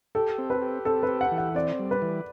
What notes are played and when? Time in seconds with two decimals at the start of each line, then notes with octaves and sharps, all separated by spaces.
0.15 G4 A4
0.38 C4
0.50 B4
0.62 G4
0.85 C4 A4
1.03 B4
1.09 G4
1.21 F#5
1.32 E3
1.38 F#5
1.55 C4 D5
1.79 G3
1.91 B4
2.02 E3